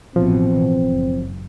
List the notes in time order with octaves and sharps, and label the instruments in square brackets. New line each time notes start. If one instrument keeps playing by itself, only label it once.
[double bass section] A1 B2 E3 [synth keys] F3 [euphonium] C4
[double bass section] F#1